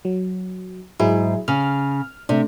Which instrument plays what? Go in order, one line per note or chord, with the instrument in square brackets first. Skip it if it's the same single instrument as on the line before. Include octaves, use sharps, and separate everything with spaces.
[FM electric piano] F#3
[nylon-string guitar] G#2 [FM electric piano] F#3 E4 G#4
[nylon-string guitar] C#3 [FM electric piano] F6
[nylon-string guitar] C3 [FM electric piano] A3 D4